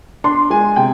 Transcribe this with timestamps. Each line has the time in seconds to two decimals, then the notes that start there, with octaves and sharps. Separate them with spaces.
0.24 D4 C6
0.50 G#3 G#5
0.76 C3 G5